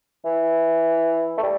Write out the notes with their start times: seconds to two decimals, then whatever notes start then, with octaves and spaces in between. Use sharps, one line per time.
0.25 E3
1.38 A3
1.42 G3